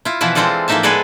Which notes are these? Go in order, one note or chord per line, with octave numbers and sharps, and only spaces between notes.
E4 F4
B2 E3 F3 E4 B4
E3 G#3 C4 F4 A4 D5
A2 F3 A#3 D#4 E5 A5
G#3 B3 G#4 A4 B4 D5